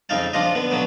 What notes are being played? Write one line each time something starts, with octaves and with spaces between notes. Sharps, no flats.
F2 C#3 D#4 F5 A5
F3 D4 F4 D#5
D3 B3
B2 D3 F#3 B3